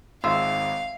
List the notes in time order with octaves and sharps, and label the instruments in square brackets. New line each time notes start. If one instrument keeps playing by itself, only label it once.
[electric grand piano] G#1 G#2 [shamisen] F4 [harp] E5 [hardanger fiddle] F5